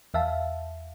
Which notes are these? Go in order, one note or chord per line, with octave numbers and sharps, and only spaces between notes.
E2 E5 F5 A5